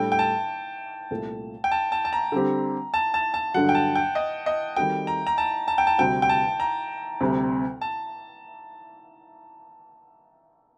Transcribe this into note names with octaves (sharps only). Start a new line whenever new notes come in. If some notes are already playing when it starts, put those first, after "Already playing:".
Already playing: A2 G3 D4 A4 G5
G5
A5
C2 A#2 A3
G5
A5
A5
A5
A#5
D3 G3 C4 G4
A5
A5
A5
G2 D3 F#3 F#5
G5
A5
G5
D#5
D#5
D#3 G3 C4 F#4 A4 G5
A#5
A#5
A5
A5
G5
A5
D2 C3 G3 C4 F#4 G5
G5
A5
A#5
D2 C3 G3 C4
A5